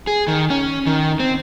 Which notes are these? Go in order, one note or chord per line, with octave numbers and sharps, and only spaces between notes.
G#4
D#3
C#4
D#3
C4